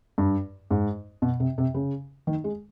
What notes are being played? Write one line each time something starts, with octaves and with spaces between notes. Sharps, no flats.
G2
G#2
B2
C3
C3
C#3
D#3
G#3